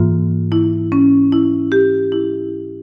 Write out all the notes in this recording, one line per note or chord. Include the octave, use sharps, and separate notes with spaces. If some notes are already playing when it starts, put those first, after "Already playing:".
Already playing: G#2 E3 A#3 F4
E4
C#4
E4
G4
E4